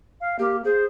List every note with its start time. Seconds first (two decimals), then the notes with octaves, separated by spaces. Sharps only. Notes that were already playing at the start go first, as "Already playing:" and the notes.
0.21 F5
0.39 A#3 G4
0.65 G#4 C5